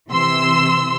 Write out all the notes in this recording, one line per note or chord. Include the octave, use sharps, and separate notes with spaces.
C3 E3 C6 E6